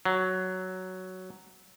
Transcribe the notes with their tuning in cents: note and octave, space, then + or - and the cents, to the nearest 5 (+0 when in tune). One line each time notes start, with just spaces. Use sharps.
F#3 +5